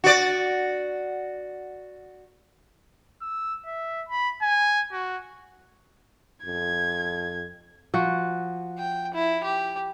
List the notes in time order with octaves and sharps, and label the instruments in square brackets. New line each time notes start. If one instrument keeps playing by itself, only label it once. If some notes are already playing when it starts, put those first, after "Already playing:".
[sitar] F#4 D5
[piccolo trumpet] E6
E5
B5
G#5
F#4
[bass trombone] F2 [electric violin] G#6
[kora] F3 F#4
[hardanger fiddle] G5
E4
G4